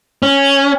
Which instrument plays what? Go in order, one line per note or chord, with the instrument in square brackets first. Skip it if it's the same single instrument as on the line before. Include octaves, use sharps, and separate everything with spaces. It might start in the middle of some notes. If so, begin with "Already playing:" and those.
[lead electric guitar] C#4